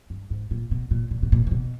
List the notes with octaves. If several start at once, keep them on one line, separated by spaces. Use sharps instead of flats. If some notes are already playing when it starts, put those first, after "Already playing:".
G2
G#2
A#2
B2
A#2
A#2
B2
A#2
C3
B2